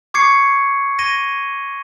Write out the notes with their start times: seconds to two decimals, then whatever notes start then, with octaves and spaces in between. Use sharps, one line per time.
0.14 C#6 D6 G#6 C7 C#7
0.99 G#6 A#6 D#7 G7